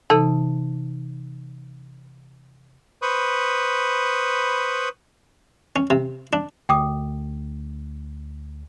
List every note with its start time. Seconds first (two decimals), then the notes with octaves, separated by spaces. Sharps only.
0.10 C3 E3 D#4 A4
3.02 B4 C5 B5 C#6 D#6
5.76 C#4
5.90 C3
6.33 D4
6.69 D2 G5 D6 D#6